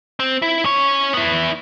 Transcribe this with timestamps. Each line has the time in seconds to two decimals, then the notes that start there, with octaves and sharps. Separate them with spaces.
0.20 C4
0.42 E4
0.65 C#4 C#5
1.14 B3 E4